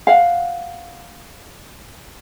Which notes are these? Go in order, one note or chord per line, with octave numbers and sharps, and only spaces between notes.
F5 F#5